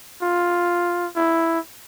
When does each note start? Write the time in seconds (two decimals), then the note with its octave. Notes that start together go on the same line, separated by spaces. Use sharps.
0.22 F4
1.16 E4